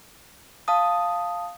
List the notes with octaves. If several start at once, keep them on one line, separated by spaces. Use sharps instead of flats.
F5 A5 D#6